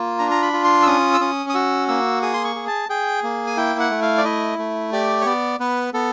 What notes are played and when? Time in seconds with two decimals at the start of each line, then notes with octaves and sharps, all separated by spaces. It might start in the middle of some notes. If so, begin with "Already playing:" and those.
Already playing: A#3 F4
0.19 D4 A#5
0.31 A#5
0.42 B5
0.53 F4
0.64 C6
0.83 E6
0.87 C#4 D#6
1.14 E6
1.21 C#4 D#6
1.49 D#6
1.54 F#4 E6
1.88 A#3 E6
2.22 G#4 D#6
2.34 C6
2.44 C#6
2.55 G#4
2.67 A5
2.89 G#4 G5
3.23 A#3
3.47 G#5
3.57 E4 G5
3.80 F#5
3.91 A3
4.02 F5
4.18 D5
4.25 E4 D#5
4.58 A3
4.92 G4 D5
5.21 C#5
5.26 B3 D5
5.60 B3 B4
5.94 B3 A4